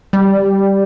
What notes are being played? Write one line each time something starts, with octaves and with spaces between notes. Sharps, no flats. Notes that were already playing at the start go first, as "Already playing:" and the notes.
G3